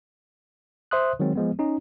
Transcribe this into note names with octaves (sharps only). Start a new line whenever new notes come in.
C5 E5 C6 D#6 F#6
D#3 F#3 G#3 C4
F3 G#3 B3
C#4 D#4